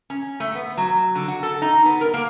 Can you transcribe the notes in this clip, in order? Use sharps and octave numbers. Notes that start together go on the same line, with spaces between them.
C#4
A3
B3
F#3
D3
F#4
A4
D#4
B3
A#4
A#3